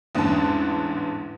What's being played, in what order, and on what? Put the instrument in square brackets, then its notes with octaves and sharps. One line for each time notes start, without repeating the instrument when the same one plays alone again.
[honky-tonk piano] A1 E2 G#2 D3 C#4 A5